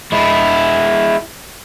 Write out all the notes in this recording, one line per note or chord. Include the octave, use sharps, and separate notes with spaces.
G#3 E4